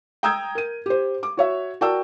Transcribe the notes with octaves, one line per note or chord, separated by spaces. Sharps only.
G5 A#5 D#6 E6 G6 G#6
A#4 D#7
G4 C5
D6
F#4 C#5 E5
F#4 A#4 D5 G5 A5 E6